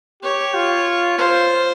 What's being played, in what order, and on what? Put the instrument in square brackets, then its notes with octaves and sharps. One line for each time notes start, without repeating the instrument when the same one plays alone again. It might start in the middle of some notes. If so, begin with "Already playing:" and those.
[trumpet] G4 [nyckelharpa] C#5
[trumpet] F4
[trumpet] F4 [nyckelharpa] C5